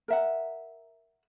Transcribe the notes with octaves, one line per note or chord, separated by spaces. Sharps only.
A#4 E5 F#5